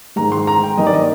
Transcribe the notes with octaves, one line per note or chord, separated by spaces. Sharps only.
G#2 D#3 G#3 A#5
C6
A#5
G5
G2 D#3 A#3 D#5
D5
D#5